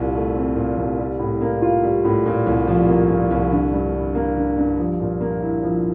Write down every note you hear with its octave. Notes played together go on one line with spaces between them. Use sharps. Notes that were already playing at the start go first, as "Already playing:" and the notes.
Already playing: C2 A#2
A3
C4
A#2
C2
G3
A2
A#3
F4
G3
A2
A#2
C2
F3
A#3
A#2
C2
D3
G2
G3
A#3
D3
G2
F3
A#2
A#3
E4
F3